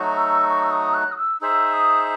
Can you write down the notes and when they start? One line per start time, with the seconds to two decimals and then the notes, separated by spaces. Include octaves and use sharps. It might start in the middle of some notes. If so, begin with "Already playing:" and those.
Already playing: F#3 A3 D#4 F#4
0.16 E6
0.48 C#6
0.63 E6
0.71 D#6
0.94 F#6
1.12 D#6
1.18 E6
1.41 D#4 G#4 C5 E5 E6
1.73 D#6